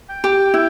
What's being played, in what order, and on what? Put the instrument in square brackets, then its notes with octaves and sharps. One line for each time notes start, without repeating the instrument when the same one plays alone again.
[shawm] G5
[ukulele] G4
[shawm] G5
[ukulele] E4 [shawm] G5